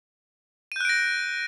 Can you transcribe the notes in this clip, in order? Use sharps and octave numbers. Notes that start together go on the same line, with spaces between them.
F#6 G6 A#6 D7 D#7